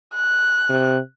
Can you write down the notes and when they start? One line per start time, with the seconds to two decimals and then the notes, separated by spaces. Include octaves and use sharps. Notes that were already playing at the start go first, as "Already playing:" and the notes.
0.14 F#6
0.70 C3